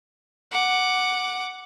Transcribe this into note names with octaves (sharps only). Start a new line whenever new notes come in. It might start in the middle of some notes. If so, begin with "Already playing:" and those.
F#5 D6